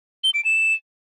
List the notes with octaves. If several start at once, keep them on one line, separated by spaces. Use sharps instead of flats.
G7
D7
E7